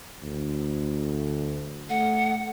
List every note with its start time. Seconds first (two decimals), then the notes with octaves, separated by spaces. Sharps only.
0.23 D2
1.90 A3 F#5